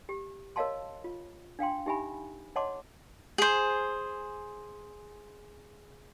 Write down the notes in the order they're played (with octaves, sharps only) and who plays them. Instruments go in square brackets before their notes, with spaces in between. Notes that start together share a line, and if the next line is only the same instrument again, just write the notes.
[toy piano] G4
A#4 C#5 D#5 F5 A5 C6
F4
D4 F5 G5 C6
D#4 G4 E5 G#5 B5
C#5 D#5 F#5 A5 C6 D6
[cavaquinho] G#4 C5